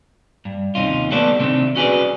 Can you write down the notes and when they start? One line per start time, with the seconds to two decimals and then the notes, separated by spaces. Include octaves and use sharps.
0.45 G2
0.75 D#2 C3 C#4 D#4 F4
1.11 G3 A3 B3 A4 B4 D5
1.39 C3 D#3 A3 C4 D4
1.76 C#4 F#4 G#4 A4 B4 D5